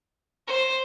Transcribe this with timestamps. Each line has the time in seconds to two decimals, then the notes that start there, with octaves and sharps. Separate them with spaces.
0.47 C5